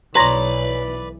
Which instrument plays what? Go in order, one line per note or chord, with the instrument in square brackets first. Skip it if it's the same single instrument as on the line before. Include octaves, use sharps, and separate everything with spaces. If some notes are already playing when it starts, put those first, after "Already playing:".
[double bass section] B1 E3 [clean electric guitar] B4 D5 [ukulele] C#5 A#5 [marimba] C6 A#6